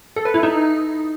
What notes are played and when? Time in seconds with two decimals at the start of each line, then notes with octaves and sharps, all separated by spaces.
0.16 A4
0.25 B4
0.34 E4
0.43 D#4